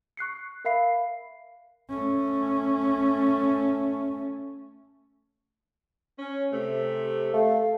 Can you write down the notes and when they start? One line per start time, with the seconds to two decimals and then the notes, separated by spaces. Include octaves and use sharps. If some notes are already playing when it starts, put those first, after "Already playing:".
0.17 C#6 F#6 C7 C#7
0.65 A#4 E5 F5 B5 C7
1.90 A3 C#4
6.19 C#4
6.52 C3 A3
7.34 A3 F5